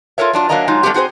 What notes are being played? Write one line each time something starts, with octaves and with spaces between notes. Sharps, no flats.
F4 A4 A#4 C#5 E5
F#3 D4 F4
F#3 G#3 A#3 D4 D#5 A#5
F#3 G#3 D#4 F4
G3 A3 B3 C4 F#4 G4
C4 F#4 G#4 B4 C5